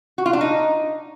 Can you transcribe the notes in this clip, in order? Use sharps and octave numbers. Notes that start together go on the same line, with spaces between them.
F#4
F4
D4
D#4